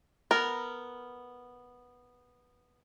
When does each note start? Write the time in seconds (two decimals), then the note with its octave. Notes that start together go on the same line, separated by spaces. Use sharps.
0.31 B3 A#4